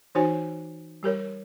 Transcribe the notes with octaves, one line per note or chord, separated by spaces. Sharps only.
E3 D#4 F#4 C5 C#5 G#5
G3 G4 A#4 C#5